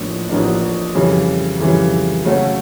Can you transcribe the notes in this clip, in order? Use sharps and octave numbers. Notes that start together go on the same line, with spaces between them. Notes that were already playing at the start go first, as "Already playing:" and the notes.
Already playing: A1 A2 F3 A#3 D4
A1 A2 F3 A#3 D4
F2 C#3 E3 G3
F2 C#3 E3 G3
C#3 F#3 A3 C#4 F#4